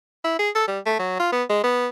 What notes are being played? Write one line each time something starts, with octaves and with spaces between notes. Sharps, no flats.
E4
G#4
A4
G3
A3
F#3
F4
B3
G#3
B3